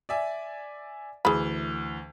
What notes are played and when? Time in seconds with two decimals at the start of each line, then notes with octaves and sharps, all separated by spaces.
0.09 D5 E5 G#5
1.25 D2 E3 G#4 B5